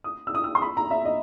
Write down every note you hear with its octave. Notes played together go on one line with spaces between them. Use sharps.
D#6
E6
D#6
E6
C6
B5
A#5
E5
D#5